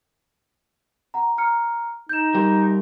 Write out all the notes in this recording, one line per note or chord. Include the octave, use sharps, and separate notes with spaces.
F#5 A#5
A#5 F6 C#7
D#4 G6 E7
G3 G4 A#4